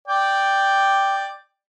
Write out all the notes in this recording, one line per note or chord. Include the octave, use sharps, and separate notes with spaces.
D5 G5